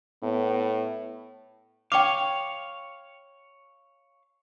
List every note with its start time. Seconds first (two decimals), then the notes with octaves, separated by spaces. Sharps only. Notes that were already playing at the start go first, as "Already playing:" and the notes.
0.23 A2 B3
1.92 C#5 F5 G5 D6